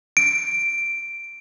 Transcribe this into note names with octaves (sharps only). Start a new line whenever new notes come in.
D7